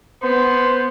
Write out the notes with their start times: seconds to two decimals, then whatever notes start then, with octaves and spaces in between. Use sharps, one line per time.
0.22 B3 C5